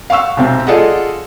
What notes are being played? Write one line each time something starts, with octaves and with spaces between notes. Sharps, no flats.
F5 F#5 C#6 E6
B1 C3 C4
F4 G#4 A4 D5 D#5 F#5